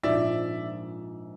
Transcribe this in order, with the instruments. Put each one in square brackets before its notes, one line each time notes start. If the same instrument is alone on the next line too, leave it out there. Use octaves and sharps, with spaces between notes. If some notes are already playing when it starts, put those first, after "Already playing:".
[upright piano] A#1 G#2 F3 [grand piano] D5 E5